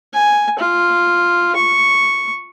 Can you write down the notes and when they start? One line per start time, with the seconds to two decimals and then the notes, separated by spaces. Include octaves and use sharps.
0.14 G#5
0.59 F4
1.55 C#6